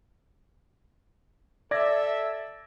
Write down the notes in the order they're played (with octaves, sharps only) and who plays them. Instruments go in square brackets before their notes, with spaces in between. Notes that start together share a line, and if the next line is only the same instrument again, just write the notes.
[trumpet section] A4 E5 [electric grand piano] D5 G#6 A#6